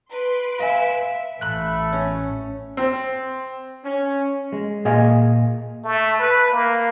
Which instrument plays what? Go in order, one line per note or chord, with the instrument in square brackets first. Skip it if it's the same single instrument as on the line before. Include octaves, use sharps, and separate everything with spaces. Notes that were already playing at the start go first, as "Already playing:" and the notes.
[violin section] B4 C6 D7
[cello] E5 [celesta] F5 G#5
[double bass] A1 [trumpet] A3 [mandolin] B5 F#6
[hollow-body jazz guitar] C#4
[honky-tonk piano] C4
[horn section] C#4
[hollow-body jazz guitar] G#3
A#2 G#4 D#5 F5 G#5
[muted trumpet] A3
B4
A#3